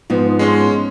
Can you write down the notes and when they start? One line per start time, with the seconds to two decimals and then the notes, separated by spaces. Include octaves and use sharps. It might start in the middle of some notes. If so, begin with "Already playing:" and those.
0.10 G#2 F3 B3
0.39 G#3 C#4 C6